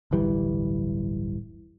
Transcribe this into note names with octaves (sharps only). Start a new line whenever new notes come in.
D1 G1 E3 G3